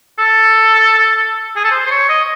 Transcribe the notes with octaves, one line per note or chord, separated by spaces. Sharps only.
A4
G#4
A4
C5
C5
C#5
D#5